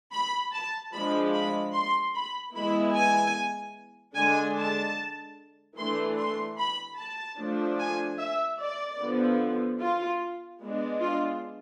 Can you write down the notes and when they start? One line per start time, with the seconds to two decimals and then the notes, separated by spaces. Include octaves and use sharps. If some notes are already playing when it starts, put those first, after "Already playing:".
0.12 B5
0.53 A5
0.94 F3 G#3 D4 B5
1.33 B5
1.73 C6
2.14 B5
2.54 E3 G#3 B3 E4 B5
2.94 G#5
4.15 D3 G#3 D4 G#5
4.57 A5
5.76 E3 A3 D4 C6
6.18 C6
6.58 B5
6.98 A5
7.38 F3 A3 D4
7.79 G#5
8.18 E5
8.59 D5
8.99 D3 F3 B3
9.80 F4
10.62 G#3 B3 D4
11.01 F4